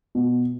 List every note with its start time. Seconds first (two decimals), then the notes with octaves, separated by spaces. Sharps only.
0.15 B2